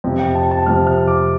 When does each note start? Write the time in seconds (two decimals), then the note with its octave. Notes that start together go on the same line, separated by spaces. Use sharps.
0.04 F2 C3 F3
0.19 G5
0.35 A5
0.51 A5
0.66 F2 C3 F3 F6
0.87 F6
1.08 D6